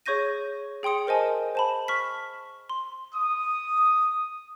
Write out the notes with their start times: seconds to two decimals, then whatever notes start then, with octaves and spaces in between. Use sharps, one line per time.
0.06 G#4 C#5 C#6 G6 A#6 D#7
0.83 G#4 G5 C6 D#6 C#7
1.07 A#4 C5 D#5 G#5 A5
1.55 C5 A5 B5
1.88 C#6 F6 B6
2.70 C6
3.15 D#6